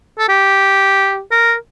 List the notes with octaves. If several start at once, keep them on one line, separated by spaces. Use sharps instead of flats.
A4
G4
A#4